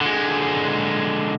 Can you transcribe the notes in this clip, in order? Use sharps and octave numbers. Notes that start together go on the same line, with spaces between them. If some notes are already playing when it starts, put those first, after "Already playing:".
D3 G#3